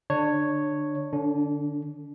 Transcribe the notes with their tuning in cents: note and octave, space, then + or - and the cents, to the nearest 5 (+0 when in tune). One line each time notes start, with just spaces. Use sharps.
D3 +0 D4 +25 C#5 +0
D3 +15 D4 -30